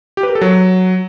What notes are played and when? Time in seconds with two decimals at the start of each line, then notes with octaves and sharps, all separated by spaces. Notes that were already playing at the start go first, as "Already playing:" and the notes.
0.17 G4
0.23 B4
0.29 A#4
0.35 A4
0.41 F#3